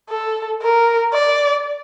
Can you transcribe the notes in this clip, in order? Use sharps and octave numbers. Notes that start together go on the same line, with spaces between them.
A4
A#4
D5